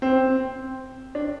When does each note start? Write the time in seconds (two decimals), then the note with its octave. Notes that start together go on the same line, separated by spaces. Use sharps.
0.02 C4
1.15 D4